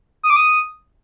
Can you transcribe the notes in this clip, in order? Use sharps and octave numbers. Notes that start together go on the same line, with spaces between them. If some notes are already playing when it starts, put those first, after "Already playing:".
D#6
D6
D#6